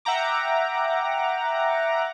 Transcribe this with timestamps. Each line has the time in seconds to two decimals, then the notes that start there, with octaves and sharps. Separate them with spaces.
0.05 E5 F#5 G5 A#5 D6